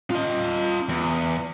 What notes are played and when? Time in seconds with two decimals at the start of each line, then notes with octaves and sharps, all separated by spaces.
0.11 F4 D#5
0.89 E2